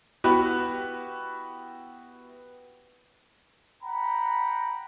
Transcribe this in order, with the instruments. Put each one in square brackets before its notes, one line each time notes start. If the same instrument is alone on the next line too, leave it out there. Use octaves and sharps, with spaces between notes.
[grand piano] B3 E4 F#4 G4 B4
[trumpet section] F#5 G5 A#5 B5